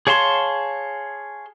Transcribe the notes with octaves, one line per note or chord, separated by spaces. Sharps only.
G#4 C#5 F5 A5 C6